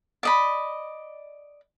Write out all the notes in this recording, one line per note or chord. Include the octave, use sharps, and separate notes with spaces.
D5 D#5 B5